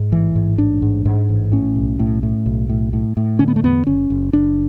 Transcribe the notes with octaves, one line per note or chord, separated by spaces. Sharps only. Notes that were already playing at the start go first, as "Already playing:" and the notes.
Already playing: G#2
A1 E3
G#2
A1 D4
G#2
G#2
A1
A2 C#4
B1
A2
A2
B1
A2
A2
A2
D3 C#4
B3
A3
E2 B3
F#1 C#4
F#1
F#1 D4